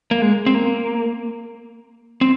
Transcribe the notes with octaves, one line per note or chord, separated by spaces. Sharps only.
A#3
G#3
C4
A#3
C4